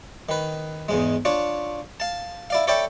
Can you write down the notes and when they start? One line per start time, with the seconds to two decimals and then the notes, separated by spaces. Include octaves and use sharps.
0.29 D#3 B4
0.89 E2 G#2 G#3
1.25 D4 F4 C#5
2.00 F5 A5
2.50 E4 D5 F5
2.67 A4 C#5 D5 E5 G5 B5